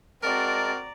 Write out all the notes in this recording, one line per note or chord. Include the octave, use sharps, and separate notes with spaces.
G#3 C4 F#4 A#4 D5 A5 A#5